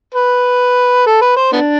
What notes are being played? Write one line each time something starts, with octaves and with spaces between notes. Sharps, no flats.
B4
A4
B4
C5
B3 D4